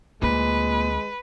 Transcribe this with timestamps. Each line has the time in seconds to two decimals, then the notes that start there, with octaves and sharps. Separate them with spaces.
0.22 D2 A#2 G#3 C4 B4